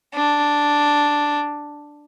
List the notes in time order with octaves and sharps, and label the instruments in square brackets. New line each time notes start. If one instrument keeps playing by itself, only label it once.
[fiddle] D4